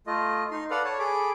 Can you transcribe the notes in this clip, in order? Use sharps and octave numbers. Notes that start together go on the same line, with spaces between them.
A3 F4 D#5
D#4 C6
A4 B4 D5 F5 F#5
C#5 A5
G#4 A4 B5 D6